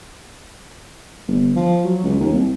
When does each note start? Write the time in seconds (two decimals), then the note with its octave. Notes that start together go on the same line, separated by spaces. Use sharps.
1.28 G1
1.56 F3
1.84 F#3
2.04 C#2
2.20 D#2
2.33 C2